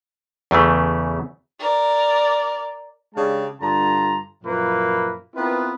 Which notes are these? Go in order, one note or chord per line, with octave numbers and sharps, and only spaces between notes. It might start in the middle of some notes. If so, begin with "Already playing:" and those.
E2 C#3 E3 A3
A#4 D5
C#3 G#3 D4 G4 F5 A5
G2 D3 F4 A5 A#5 C6
F#2 A#2 F3 A#3 E4 B4
B3 C4 E4 F4 A#4 B4